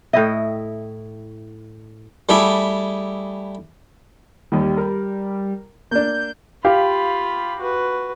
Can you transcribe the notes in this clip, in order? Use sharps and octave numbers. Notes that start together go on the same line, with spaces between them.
A2 E4 D#5 E5 G5
G3 A3 E4 G4 G#4 E5
D#2 D#3 G3
A#4
A#3 D4 G6
F4 G4 F5 B5
F#4 B4